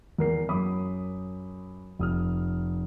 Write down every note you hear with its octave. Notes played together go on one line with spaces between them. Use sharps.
E2 A#4 C7
F#2 B5 D6 D#6
F1 D#6 F6